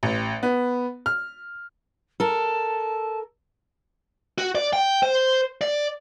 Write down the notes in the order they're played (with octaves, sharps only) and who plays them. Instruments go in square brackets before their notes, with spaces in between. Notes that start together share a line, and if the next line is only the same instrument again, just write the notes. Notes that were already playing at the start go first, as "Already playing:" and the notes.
[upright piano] A1
B3
F6
[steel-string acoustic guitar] A4 A#4 [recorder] A5
[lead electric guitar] F#4
D5
G5
C5
D5